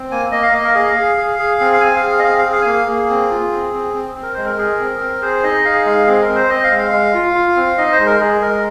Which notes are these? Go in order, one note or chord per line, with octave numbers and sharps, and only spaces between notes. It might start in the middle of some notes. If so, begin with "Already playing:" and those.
Already playing: C4
A#3 G#5
A#3 D#5
F5
A#3 D#5
A#4
G#4 D#5
F5
G#4
G#4
G#4
C4
F5
C4 G#5
F5
G#4
F5
D#5
C4 F5
F5
G#4
F5
G#5
A#3 F5
A#3 G#4
C4
F4
C4
C4
C4
C4
A#4
G#3 C5
A#4
G#4
C4
C4
G#4 C5
D#4 D#5
G#4 F5
G#3 F5
C4 G#4
A#4
C4
C5
C4 D#5
F5
G#3
F5
G#3
F4
F4
C4
D#4 D#5
C5
G#3
A#4
G#3 G#4
G#3 A#4